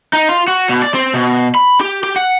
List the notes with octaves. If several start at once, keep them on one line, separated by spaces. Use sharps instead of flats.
D#4
F4
F#4
B2
D5
C4
B2
B5
G4
G4
F#5